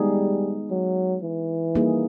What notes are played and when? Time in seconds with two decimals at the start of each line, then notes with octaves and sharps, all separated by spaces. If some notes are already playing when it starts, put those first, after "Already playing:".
Already playing: G3 G#3 B3 D#4 G#4
0.70 F#3
1.22 E3
1.75 G3 A#3 D#4 G#4